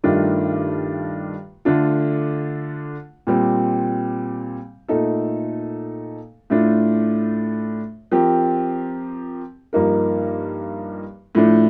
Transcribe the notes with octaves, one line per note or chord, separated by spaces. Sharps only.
G2 D#3 A3 D4 F4
D3 A3 D4 F4
A#2 G3 C4
A#2 A3 D#4 A4
A2 A3 D4 F4
F3 C4 G4 A#4
G2 F3 A#3 D#4 A#4
A2 F3 A3 D4